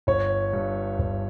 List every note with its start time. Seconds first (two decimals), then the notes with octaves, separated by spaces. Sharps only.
0.07 G1 C#5
0.53 G2
0.99 G1